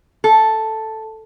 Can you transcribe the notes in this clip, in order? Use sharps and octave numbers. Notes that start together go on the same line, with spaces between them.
A4